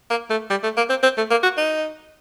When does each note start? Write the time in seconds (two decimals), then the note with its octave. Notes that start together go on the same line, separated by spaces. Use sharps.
0.10 A#3
0.30 A3
0.50 G3
0.63 A3
0.77 A#3
0.89 C4
1.03 C4
1.17 A3
1.31 A#3
1.43 F#4
1.57 D#4